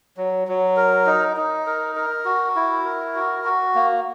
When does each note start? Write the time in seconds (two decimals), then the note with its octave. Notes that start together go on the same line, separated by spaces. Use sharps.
0.17 F#3
0.48 F#3
0.77 A#4
1.06 D#4
1.37 D#4
1.67 A#4
1.96 A#4
2.25 F#4
2.56 E4
2.85 A#4
3.15 F#4
3.44 F#4
3.75 A#3